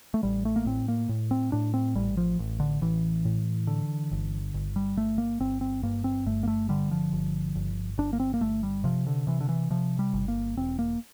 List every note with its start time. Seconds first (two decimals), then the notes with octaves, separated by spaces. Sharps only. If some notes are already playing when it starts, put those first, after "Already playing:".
0.14 A3
0.23 A1 G3
0.45 A3
0.56 A#3
0.66 A2 C4
0.88 A#3
1.09 A2
1.31 C4
1.52 A2 D4
1.74 C4
1.95 A1 G3
2.17 F3
2.39 A1
2.60 D3
2.82 A1 E3
3.25 A2
3.67 D3
4.12 G1
4.54 G1
4.76 G3
4.97 G1 A3
5.18 A#3
5.40 G1 C4
5.61 C4
5.83 G2 A#3
6.04 C4
6.26 G1 A3
6.43 A#3
6.48 A3
6.69 D3 G3
6.91 F3
7.12 G1
7.55 G1
7.98 G1 D4
8.13 A#3
8.20 C4
8.34 A#3
8.41 G1 A3
8.63 G3
8.84 C3 F3
9.07 D3
9.27 C3 E3
9.41 D3
9.49 E3
9.70 C3 F3
9.99 G3
10.13 G1
10.28 A#3
10.57 E1 C4
10.79 A#3